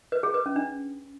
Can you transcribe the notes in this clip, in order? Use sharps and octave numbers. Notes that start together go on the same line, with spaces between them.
B4
G#4
B4
C#4
D4